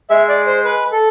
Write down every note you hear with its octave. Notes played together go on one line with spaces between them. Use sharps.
G#3 E5
D5
C5
B4
A4